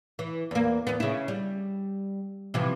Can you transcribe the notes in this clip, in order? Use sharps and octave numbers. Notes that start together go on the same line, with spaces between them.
E3
E2 A#3
E2 B3
C#3 E4
G3
C3 E3 F3